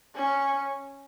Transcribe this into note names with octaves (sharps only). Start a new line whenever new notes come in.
C#4